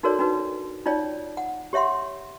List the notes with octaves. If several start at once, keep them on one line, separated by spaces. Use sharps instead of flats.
D#4 F#4 A4 A#4 C#5 D5
D4 D#4 F#4 B4
D#4 F4 C#5 D5 G5
F#5
G4 C#5 E5 F#5 C6